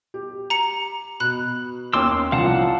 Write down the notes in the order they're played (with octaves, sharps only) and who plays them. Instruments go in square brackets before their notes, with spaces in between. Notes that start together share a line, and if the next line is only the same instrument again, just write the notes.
[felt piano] G4
[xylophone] A#5 C#7
[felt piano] B2 [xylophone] B5 F#6
[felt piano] D#2 C#4 [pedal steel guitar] C6 D6 E6
[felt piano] C2 F3 [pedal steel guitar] F5 F#5 A5